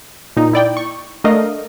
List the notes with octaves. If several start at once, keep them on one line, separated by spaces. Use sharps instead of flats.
A#2 D#4
E4 D5 G5
C#6
A3 D4 A#4 D#5 F5